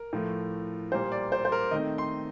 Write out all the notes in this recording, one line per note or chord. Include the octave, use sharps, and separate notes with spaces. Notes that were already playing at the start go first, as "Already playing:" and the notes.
Already playing: A#4
A2 F3 A3
A#2 G3 A#3 C5
D5
C5
C5
A#4
D#3 A3 C4 D#5
C6